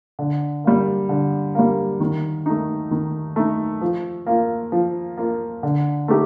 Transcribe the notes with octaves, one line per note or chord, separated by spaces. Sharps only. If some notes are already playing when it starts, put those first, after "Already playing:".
D3
G3 A#3
D3
G3 A#3
D#3
A3 D#4
D#3
A3 D#4
F3
A#3 F4
F3
A#3 F4
D3
A3 D#4 G4